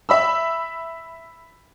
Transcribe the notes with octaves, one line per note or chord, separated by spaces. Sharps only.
E5 B5 E6